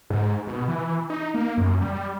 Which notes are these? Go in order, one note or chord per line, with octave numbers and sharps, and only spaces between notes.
G#2
B2
E3
D#4
A#3
F#2
G3